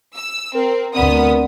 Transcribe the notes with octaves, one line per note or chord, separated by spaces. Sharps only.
E6
C4 A#4
D2 B3 C4 D5 F#5 D#6